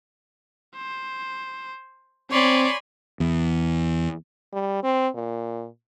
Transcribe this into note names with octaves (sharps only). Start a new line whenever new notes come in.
C5
C4 C#5 D5 G#5 B5 C6
E2
G3
C4
A#2